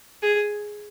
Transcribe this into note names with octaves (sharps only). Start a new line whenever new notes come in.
G#4